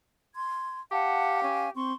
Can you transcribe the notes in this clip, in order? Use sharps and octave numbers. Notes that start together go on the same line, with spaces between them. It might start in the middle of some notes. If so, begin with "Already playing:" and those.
C6 G#6
G4 F5 F#5 A5
C#4 G#5
C4 C6 C#6